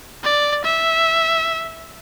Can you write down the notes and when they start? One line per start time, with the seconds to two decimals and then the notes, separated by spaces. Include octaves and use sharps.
0.24 D5
0.65 E5